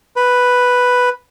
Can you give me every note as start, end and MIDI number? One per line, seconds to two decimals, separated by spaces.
0.16 1.09 71